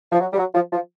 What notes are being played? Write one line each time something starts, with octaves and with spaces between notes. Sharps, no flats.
F3
F#3
G3
F#3
F3
F3